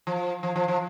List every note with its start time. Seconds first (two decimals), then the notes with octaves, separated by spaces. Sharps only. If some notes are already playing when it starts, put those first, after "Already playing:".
0.07 F3
0.43 F3
0.56 F3
0.68 F3